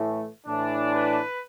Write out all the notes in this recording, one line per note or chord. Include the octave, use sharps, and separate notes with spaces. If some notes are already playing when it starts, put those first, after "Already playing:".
Already playing: A2 E3 A3
A2 E3 D4
B4